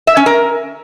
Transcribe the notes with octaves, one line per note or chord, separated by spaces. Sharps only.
E5
C#4
A#4